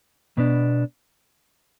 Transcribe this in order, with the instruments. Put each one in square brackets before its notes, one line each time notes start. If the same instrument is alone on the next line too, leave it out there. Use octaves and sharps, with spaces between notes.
[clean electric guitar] B2 B3 D4